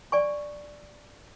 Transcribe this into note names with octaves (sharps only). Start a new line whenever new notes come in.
D5 G#5 C#6